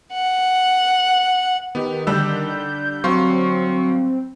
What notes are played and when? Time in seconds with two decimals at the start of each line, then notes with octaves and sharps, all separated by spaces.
0.14 F#5
1.75 D#3 B3 G4
2.07 D3 G3 D4 E6 G6
3.04 F#3 C4 F5 C6 C#6